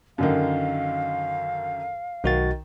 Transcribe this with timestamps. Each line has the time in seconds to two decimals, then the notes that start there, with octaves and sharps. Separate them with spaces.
0.18 F#2 D3 D#3 F5
2.24 B1 D#3 F#4 A6